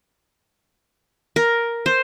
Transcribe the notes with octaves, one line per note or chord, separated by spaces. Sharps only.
A#4
C5